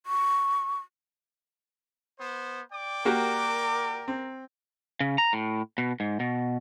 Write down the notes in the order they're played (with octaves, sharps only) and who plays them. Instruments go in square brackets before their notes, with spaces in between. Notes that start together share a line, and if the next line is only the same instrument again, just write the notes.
[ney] C#6
[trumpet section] B3 C5
D5 G5 D6
[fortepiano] A#3 F#4 G4 [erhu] A#4
[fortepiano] C4
[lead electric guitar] C#3
A#5
A2
B2
G#2
B2